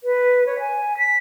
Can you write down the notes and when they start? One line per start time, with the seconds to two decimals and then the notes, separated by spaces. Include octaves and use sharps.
0.04 B4
0.46 C#5
0.59 G#5
0.98 B6